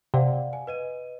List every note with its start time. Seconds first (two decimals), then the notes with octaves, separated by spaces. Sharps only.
0.14 C3 D5 F5 F#5
0.53 G#5
0.67 B4 D#5 D#7